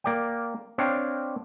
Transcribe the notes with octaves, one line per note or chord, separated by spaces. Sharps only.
A#3 D5 G5
C4 D4 C#5 F5 G5